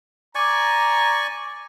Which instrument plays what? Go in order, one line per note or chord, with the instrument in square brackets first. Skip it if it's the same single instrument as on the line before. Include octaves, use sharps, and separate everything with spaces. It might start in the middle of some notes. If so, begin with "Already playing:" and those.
[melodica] D5 G#5 C#6 [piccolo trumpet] A#5 [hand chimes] D6 G#6